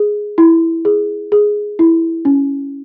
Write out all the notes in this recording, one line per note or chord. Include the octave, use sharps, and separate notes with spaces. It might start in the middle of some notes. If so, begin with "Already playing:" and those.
Already playing: G#4
E4
G#4
G#4
E4
C#4